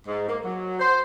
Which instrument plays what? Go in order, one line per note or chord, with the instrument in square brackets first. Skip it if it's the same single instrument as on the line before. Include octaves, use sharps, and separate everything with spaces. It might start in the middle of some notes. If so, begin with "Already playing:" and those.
[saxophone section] G#2
A#3
F#3
C5